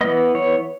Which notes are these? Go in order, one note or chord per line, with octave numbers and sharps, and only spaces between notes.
E3 B3 D#5
C#5